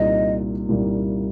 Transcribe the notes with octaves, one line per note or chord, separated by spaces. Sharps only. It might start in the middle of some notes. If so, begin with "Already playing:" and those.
Already playing: C2 A#2 G3 A#3 D#4 D#5
C2 A#2 G3 A#3 D#4